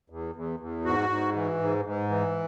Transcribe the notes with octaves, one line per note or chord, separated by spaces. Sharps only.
E2
E2
E2
G#2 F#4
G#2
E3
G#2
G#2
E3